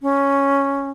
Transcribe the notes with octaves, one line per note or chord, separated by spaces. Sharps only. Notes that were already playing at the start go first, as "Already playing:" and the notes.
C#4